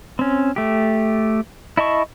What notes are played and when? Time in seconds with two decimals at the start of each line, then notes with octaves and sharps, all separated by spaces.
0.19 C4 C#4
0.56 A3 G4
1.77 E4 D#5 A5 C#6